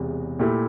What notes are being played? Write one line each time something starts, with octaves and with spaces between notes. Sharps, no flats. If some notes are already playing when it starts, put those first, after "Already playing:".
Already playing: E1 E2 C3
A#2 A3 E4 G4